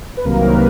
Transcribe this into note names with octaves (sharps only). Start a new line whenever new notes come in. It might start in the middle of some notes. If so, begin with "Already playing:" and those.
B4
C2 C3 D#3 F#3 A#3 A#4
B4